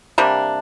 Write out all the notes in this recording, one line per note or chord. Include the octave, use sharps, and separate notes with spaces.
C3 G3 A#3 D4